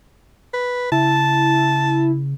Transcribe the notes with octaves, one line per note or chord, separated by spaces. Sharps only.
B4
C#3 E4 A5